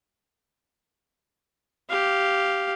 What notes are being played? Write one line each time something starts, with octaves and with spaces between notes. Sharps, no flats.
G4 F5